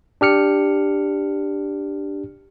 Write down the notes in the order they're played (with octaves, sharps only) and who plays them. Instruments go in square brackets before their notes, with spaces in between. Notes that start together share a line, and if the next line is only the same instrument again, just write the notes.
[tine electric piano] D4 G4 F6 C#7